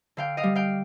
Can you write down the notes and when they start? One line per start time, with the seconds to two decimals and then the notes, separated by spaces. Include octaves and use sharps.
0.17 D3 F5 G5
0.37 D#5 F5
0.43 G3
0.55 F5 G5